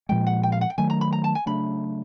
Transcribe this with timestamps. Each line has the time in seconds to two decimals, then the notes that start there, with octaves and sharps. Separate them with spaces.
0.09 A#2 F3 G#3 G5
0.27 F#5
0.43 G5
0.52 F5
0.61 F#5
0.70 G5
0.78 D#3 F#3 A3 G#5
0.90 A#5
1.01 B5
1.12 A#5
1.24 A5
1.35 G#5
1.46 C#3 F#3 A3 D4 B5